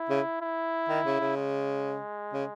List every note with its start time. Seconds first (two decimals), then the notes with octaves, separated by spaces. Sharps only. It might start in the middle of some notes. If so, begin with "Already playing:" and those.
Already playing: E4
0.09 C#3
0.41 E4
0.89 D#3
1.05 C#3
1.20 C#3
1.37 G#3
2.33 C#3